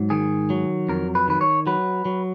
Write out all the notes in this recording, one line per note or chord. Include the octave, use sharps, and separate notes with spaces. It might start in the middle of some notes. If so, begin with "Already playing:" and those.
Already playing: G#2 F#3
D#3 G#4
F#3
F2 A#4
B4
D#3 B4
C#5
F#3 B4
F#3